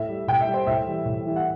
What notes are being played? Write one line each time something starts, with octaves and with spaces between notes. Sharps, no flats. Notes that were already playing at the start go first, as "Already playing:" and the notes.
Already playing: A2 E5
G3
A2 G5
E5
G3
C5
A2 E5
E3 G3
A2
E3 G3
F#5